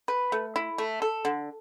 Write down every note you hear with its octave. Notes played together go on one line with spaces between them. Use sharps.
B4
A3
E4
A3
A4
D3